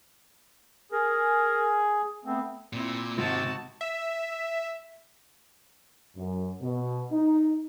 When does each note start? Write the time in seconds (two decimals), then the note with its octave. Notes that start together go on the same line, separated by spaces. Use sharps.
0.92 G#4 A#4
2.25 A3 B3 C4
2.73 A#2 C4 E4
3.18 G#1 C3 F#4 A5
3.81 E5
6.16 F#2
6.61 B2
7.12 D#4